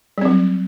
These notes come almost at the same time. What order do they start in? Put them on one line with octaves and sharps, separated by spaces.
G3 C4 F#3